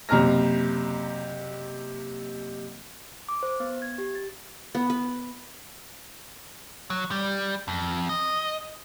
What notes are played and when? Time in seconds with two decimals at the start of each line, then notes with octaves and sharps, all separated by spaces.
0.09 F#1 C3 A#5 F6 A#6
3.29 D6
3.43 C5
3.60 B3
3.82 G#6
3.98 G4
4.15 A6
4.75 B3
4.90 B4
6.90 F#3
7.11 G3
7.68 F2
8.09 D#5